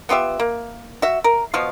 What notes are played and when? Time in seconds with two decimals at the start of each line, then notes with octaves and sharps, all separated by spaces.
0.09 B3 F4 G4 E5
0.40 A#3
1.02 F#4 E5
1.24 A#4
1.54 B2 F3 F5 C#6